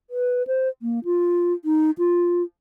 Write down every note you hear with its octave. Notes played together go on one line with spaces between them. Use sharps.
B4
C5
A#3
F4
D#4
F4